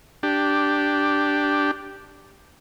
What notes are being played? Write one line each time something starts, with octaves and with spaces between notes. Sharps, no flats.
D4 G4